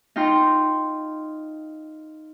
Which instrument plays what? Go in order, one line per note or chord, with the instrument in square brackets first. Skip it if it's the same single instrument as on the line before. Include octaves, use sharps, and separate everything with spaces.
[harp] D#4 F4 G5 A#5 C6